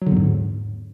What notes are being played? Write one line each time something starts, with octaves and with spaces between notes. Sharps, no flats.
F#3
D3
E2
G#2